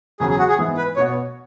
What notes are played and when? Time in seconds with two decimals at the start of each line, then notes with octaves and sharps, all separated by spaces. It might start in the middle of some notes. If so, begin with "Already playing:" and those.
0.20 E2 C#3 F#3 C#4 F#4 G#4
0.30 G#4
0.39 F#4
0.49 G#4
0.58 G#2 E3 B3 E4
0.77 B4
0.96 B2 B3 F#4 C#5